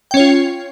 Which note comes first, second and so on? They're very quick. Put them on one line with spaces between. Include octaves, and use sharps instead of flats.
G5 C#4 C#5 F4